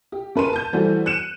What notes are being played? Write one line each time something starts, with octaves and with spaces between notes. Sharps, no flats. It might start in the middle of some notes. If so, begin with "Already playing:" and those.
G4
C#3 A#4 B4 A5 C6 D#7
A5 G6
E3 G3 A3 F#4 A4 C5
F#6 C#7 D#7 E7